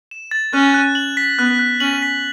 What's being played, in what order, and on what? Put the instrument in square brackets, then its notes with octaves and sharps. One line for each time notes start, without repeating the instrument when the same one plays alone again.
[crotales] E7
A6
[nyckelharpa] C#4 [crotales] F#6
[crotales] F#6
F#7
B6
[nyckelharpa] B3 [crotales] F#6
[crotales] F#6
[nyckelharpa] C#4 [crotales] F#7
[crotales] B6